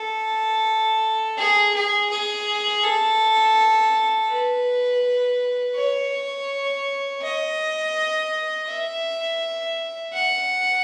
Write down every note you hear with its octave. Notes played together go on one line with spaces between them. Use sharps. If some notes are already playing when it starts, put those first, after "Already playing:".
Already playing: A4
G#4
G#4
G#4
A4
B4
C#5
D#5
E5
F#5